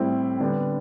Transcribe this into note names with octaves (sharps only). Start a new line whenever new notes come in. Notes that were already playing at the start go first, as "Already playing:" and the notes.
Already playing: A2 G3 C4 E4
D3 G3 B3 D4